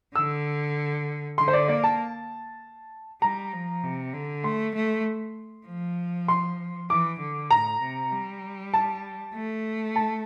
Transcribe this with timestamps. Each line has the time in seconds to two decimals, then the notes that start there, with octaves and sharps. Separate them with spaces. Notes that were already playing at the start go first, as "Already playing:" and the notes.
0.15 D3 E6
1.38 D3 C6
1.48 C5
1.53 D5
1.68 A#3 D5
1.84 A5
3.22 G3 A#5
3.53 F3
3.84 C3
4.14 D3
4.44 A3 C6
4.75 A3
5.66 F3
6.28 C6
6.90 E3 D6
7.20 D3
7.50 A2 A#5
7.82 C3
8.12 G3
8.74 A5
9.34 A3
9.96 A5